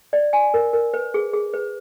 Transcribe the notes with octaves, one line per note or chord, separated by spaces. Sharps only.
D5
G#5
A#4
A#4
B4
G#4
G#4
B4